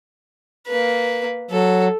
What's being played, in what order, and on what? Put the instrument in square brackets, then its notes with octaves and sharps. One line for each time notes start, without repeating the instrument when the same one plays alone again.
[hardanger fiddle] A#3 B4
[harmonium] F#3 [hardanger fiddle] A4